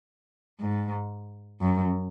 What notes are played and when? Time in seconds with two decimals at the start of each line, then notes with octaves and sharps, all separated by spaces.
0.60 G#2
1.61 F#2